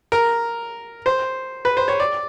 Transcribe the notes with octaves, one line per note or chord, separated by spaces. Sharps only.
A#4
C5
B4
C5
C#5
D5